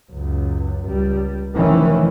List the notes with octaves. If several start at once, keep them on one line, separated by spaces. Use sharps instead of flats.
C#2 F#2
C#2 G3
F1 F2 D#3 E3 C#4